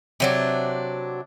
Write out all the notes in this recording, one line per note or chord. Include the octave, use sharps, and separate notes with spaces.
C3 F#3 D4